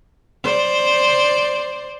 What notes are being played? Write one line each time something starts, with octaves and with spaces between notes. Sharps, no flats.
C5 D5